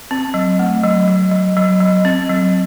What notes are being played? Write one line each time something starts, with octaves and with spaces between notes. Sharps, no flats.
C4
F#3
A3
F#3
F#3
F#3
F#3
F#3
C4
F#3